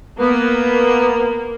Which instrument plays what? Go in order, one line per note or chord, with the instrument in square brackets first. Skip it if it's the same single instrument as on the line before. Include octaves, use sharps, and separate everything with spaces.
[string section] A#3 [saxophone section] B3